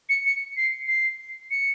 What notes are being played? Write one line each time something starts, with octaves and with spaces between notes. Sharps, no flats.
C#7
C#7
C7
C7
C#7